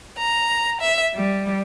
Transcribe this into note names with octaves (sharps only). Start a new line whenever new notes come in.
A#5
E5
G3